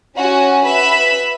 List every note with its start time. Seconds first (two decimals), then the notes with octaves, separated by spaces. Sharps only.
0.17 C#4 F#4 G#5
0.65 B4 E5 B5